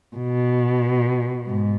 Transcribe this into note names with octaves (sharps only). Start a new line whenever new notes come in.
B2
G#2